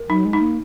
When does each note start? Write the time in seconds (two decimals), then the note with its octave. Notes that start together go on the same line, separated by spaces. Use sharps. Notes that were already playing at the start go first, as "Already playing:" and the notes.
Already playing: A#4
0.09 F#3 D#4
0.25 G#3
0.33 D#4
0.41 A#3